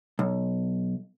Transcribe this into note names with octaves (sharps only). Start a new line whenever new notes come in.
B1